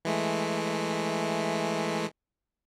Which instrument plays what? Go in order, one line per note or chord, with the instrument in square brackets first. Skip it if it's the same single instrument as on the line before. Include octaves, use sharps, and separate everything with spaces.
[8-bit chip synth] E3 G#3 A3